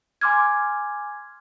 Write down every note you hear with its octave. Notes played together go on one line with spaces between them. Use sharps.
G#5 C6 D6 F6 G#6